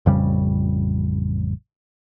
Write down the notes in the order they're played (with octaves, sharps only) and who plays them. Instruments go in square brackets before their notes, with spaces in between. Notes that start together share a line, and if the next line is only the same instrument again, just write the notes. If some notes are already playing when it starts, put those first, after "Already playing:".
[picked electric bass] A1 F2 C#3 G3